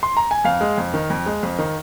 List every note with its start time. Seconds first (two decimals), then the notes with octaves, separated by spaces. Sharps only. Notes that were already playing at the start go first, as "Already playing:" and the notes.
0.03 C6
0.17 A#5
0.31 G#5
0.44 F2 F5
0.61 G#3
0.78 F2
0.94 D#3
1.10 F2
1.26 G#3
1.43 F2
1.59 D#3